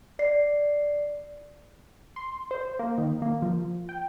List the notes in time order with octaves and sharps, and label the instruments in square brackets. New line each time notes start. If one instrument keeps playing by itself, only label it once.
[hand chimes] D5 C7
[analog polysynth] C6
C5
A#3
D#3
A#3
F3
G5